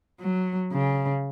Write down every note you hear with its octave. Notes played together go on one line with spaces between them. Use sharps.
F#3
C#3